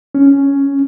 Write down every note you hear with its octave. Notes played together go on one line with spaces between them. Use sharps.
C#4